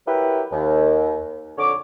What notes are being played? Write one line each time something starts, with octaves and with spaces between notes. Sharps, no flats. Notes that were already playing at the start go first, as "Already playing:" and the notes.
F#3 E4 G4 A#4 B4
D#2
F2 D3 C#5 D6